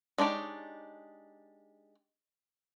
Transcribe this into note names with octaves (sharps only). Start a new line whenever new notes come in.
G#3 D4 D#4 G4 C#5